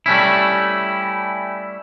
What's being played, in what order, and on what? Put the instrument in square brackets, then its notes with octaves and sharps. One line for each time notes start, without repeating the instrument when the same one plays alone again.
[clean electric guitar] G3 A3 C#4 E4